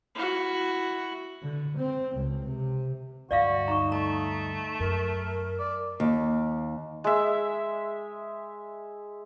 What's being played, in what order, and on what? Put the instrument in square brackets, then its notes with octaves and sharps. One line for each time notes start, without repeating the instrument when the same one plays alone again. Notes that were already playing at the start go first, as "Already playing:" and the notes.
[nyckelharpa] E4 F#4
[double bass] D3
C4
C#2
C3
[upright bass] D2 G2 [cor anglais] F#4 [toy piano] D5 E5 F5
[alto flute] D#4 [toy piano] A#5 C#6
[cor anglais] A3 [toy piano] A#5
[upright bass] F#2 [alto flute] A#4
[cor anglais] D5
[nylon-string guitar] D#2
[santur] G#3 E5